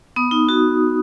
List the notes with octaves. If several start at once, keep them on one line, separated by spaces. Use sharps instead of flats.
B3 D#6
D#4
F#4